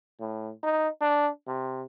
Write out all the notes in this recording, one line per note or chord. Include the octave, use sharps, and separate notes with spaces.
A2
D#4
D4
C3